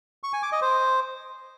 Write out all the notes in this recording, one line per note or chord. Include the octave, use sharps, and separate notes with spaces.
C#6
G#5
D6
D#5
C5